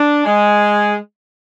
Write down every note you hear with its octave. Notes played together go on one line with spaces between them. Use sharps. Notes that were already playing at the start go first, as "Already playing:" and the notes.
Already playing: D4
G#3